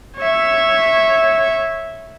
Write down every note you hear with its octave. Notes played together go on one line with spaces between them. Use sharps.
C#5 E5